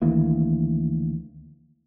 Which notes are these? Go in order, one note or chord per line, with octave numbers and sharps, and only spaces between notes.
D2 D#3 E3 A#3